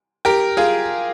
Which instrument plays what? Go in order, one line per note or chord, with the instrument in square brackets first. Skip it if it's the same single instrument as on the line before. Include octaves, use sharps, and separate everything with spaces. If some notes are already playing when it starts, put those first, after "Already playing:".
[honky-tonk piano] G4 A#4
F4 G#4